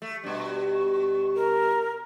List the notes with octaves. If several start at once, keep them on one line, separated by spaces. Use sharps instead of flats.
A3
G2 B2 C#6
A#4